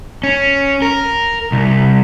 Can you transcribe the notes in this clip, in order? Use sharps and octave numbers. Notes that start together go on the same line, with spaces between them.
C#4
A#4
C2